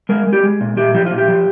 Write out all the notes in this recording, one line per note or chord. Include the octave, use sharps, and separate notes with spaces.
G#3 A#4
G#3
G4
G#3
A#2
A#2 G4
F3 G4
A#2 F4
G4
F3